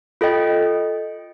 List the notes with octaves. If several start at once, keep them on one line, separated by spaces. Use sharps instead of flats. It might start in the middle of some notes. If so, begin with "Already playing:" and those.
F4 A4 D#5 G5